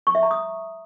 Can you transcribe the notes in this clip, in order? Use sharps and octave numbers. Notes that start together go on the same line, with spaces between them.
C#6
E5
A#5
D#6